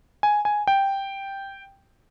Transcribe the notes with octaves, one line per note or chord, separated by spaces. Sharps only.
G#5
G#5
G5